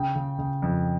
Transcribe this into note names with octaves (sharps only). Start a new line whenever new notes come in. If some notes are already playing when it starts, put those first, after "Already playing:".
Already playing: C#3 G5
C#3
C#3
F2